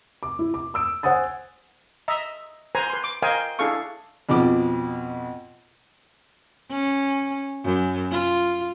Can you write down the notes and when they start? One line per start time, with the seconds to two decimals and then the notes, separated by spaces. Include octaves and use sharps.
0.23 D6
0.39 E4
0.54 D6
0.74 D#6 E6 D7
1.03 C5 F#5 G#5 D#6 A6
2.08 D#5 E5 A#5
2.75 B4 C5 G#5 A#5
2.90 B4 C6
3.04 D6
3.22 A#4 C5 D#5 F5 G5 G#5
3.59 D4 E4 G#4 A4 F5 C#6
4.29 F2 B2 F3 D6
6.71 C#4
7.65 F#2
8.12 F4